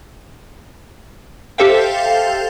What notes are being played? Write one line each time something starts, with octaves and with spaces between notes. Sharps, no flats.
G4 A4 C5 E5 F5 G5